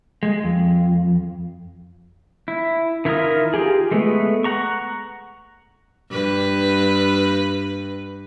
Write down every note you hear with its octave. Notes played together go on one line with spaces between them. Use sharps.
G#3
F2
E4
D#3 E4 F4 A#4 D#6
F4 G4 G#4
G#3 A3 B3
F#5 A#5 C#6
G2 B4